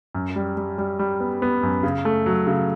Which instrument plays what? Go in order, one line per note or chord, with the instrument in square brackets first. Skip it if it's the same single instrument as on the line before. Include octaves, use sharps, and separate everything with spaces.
[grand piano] F#2
G3
G3
G3
G3
B3
B3
F#2
C#3
A3
F#3
C#3